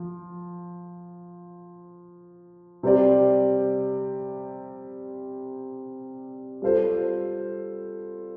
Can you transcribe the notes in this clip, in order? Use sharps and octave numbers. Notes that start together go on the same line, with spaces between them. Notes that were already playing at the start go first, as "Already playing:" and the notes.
Already playing: F3
C3 G3 C4 G4 D5
G3 F4 A4 C5